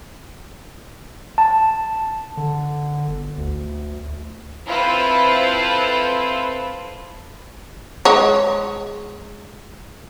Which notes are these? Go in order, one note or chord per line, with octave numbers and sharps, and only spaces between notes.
A5
D3
G1
D2
C4 E4 F4 A4 B4 C5
G#3 C#5